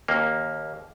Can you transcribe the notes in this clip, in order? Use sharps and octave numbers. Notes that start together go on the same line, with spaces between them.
D#2 A#3